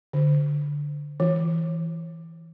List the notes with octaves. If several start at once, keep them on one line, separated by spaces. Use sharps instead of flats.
D3
E3